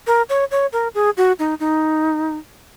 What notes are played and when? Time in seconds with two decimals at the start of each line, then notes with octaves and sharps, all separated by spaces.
0.07 A#4
0.29 C#5
0.51 C#5
0.73 A#4
0.95 G#4
1.17 F#4
1.39 D#4
1.60 D#4